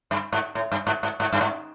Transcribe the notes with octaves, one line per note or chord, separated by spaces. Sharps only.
G2
G#2
A2
G2
G#2
G#2
G#2
G2
G#2